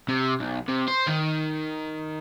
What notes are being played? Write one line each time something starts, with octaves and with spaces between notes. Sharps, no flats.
C3
B1
C3
C5
D#3